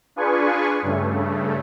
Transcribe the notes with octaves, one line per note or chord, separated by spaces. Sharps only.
D4 F4 G#4 B4 G#5 C#6
G2 C#3 A3